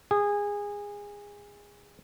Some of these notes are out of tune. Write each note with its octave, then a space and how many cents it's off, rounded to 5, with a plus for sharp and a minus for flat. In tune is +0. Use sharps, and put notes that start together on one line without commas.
G#4 -20